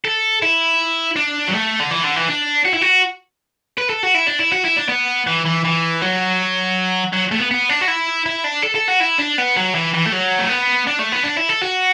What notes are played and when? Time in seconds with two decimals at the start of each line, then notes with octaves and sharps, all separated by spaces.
0.05 A4
0.42 E4
1.16 D4
1.48 F#3
1.53 A3
1.80 D3
1.91 E3
2.04 D3
2.16 E3
2.28 D4
2.65 F#4
2.74 E4
2.81 F#4
3.78 B4
3.89 A4
4.03 F#4
4.15 E4
4.27 D4
4.39 E4
4.53 F#4
4.65 E4
4.77 D4
4.89 B3
5.27 E3
5.46 E3
5.65 E3
6.02 F#3
7.13 F#3
7.32 A3
7.38 B3
7.51 B3
7.69 D4
7.81 F#4
7.88 E4
8.26 E4
8.44 D4
8.63 A4
8.75 A4
8.88 F#4
9.00 E4
9.18 D4
9.38 B3
9.57 F#3
9.75 E3
9.94 E3
10.05 A3
10.12 F#3
10.39 A3
10.49 B3
10.87 D4
10.99 A3
11.12 B3
11.23 D4
11.37 E4
11.49 A4
11.62 F#4